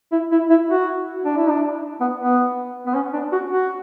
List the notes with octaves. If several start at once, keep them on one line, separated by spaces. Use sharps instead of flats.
E4
E4
E4
F#4
D4
E4
D4
B3
B3
B3
C#4
D4
F#4
F#4